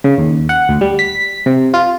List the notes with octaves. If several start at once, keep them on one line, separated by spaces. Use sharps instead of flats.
C#3
D#2
F#5
D2
G3
B6
C3
F4